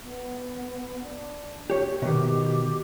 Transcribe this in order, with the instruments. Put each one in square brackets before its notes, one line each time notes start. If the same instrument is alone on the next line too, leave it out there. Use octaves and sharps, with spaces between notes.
[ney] B3
D4
[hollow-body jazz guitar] G4 C#5
[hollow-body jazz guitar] B2 D#3 [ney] G4